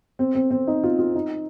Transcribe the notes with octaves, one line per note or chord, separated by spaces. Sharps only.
C4
C4
C4
D#4
F4
F4
D#4